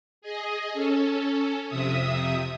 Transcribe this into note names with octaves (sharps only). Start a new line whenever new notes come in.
G#4 D#5
C#4 A4
F2 C3 E5 D#6